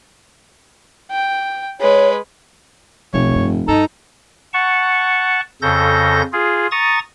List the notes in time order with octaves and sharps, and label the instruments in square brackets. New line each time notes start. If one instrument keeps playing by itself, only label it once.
[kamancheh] G5
[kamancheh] G#3 B4 [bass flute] C#5
[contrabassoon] F1 [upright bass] B1 [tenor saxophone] C#5
[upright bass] G2
[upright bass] G2 [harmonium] D#4 A#5 [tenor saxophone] A4
[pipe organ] F#5 A5 C#6
F2 C#3 A4 G6 A#6
F4 G#4
A#5 C#6 D#6 A6